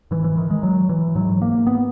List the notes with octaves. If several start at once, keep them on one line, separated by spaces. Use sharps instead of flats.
G#2 E3
E3
D#3
G#3
F#3
E3
G#2 F#3
A#3
B3